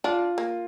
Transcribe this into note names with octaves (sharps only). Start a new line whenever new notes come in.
D4 F4
A#3